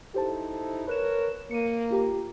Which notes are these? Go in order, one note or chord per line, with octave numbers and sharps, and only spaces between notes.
D#4 E4 G4 A4 C5 A5
A#4 B4 C#5 F#6 E7
A#3 C#7 D#7
F4 G4 A#5